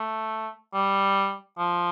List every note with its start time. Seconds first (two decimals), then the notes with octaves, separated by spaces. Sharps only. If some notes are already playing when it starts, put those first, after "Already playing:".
Already playing: A3
0.74 G3
1.58 F3